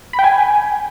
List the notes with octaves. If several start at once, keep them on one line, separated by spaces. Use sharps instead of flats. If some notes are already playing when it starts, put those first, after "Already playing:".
B5
G5
G#5